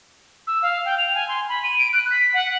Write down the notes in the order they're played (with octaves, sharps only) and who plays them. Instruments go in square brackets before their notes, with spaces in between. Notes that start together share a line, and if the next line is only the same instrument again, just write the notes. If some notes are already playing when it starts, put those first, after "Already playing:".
[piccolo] E6
F5
G5
F7
G#5
C6
B5
D#7
D7
F#6
B6
F#5